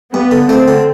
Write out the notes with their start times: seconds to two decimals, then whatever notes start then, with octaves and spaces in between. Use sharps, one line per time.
0.13 G2 B3
0.31 D3
0.49 A3 C4
0.68 D3